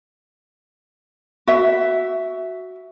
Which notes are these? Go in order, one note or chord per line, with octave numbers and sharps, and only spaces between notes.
F#4 E5